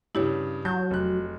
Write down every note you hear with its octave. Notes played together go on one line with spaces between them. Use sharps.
G2 C#3 E4 G4 C#5
F#3 A5 G6
F1 F#6